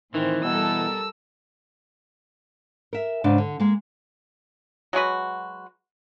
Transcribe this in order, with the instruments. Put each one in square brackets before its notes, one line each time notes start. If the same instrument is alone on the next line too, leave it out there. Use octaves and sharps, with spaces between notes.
[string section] A2 C4 [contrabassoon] D#3 [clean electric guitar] E3
[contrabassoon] B2 [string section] G3 A4 A#4 [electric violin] E6
[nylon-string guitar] A#4 E5
G#2 C#3 D4
D3
G#3 A#3
[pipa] F#3 G#3 F#4 B4